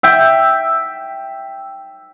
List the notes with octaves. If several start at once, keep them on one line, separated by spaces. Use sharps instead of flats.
E5 G5